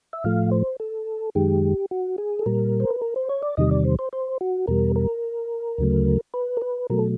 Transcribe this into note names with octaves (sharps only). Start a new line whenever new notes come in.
E5
A2 F3 A3 F5
C5
A4
F#2 D#3 G#3 G4
F#4
G#4
A4
A#2 G3 A#4
C5
B4
A#4
C5
C#5
D5
E2 C3 D#3 G3 D#5
D5
C5
C5
C5
F#4
E2 B2 G3 A#4
A#4
D2 C#3 F#3 A3
B4
A#4
B4
B2 F#3 A3 A#4
A4